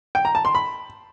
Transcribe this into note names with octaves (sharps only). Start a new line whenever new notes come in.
G5
A#5
A5
C6
B5